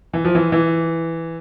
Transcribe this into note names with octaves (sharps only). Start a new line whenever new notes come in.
E3
F3
E3
E3